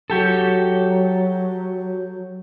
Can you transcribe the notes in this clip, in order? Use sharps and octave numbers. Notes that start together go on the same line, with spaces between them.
F#3 F#4 G4 A4